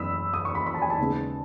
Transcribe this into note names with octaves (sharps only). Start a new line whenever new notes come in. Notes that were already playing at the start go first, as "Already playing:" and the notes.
Already playing: F#2 E3 B3 B5 D#6 E6
D#6
C#6
B5
B5
A5
G#5
A5
D#2 C#3 G#3 B3